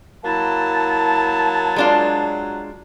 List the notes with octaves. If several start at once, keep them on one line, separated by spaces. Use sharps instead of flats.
F#3 A#3 E4 A5
G#3 D4 F4